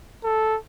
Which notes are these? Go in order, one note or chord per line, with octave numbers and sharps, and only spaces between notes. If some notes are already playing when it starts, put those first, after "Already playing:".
A4